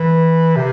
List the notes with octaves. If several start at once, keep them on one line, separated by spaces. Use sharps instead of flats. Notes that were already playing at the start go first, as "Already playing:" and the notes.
Already playing: E3
C3